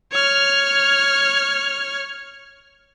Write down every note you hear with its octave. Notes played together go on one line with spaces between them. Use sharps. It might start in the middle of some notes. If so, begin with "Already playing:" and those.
C#5 F6